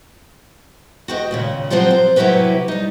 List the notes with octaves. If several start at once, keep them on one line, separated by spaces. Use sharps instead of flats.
F#4 G4 C5 D#5
D#2 A#2 C#3
F3 F#3 C4 F4 G4 C5
C5
C3 F#3 E4 F#4 G4 B4
G3 D#4